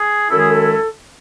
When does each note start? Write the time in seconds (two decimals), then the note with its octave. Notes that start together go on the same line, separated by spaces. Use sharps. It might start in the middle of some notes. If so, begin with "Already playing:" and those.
Already playing: G#4
0.29 F#2 D#3 G#3 C#4 E4 A4
0.39 G#4
0.47 A4